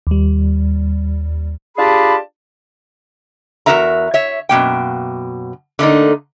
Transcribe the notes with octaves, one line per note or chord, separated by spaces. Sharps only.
D#2 G3
D4 F4 G4 G#4 A5 B5
E2 C#3 F#4 A#4 E5 A#5
C#5 E5
F#2 B2 A#3 G5
D3 A3 A#3 D#4